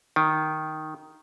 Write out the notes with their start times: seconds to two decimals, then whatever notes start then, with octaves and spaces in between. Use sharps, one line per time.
0.16 D#3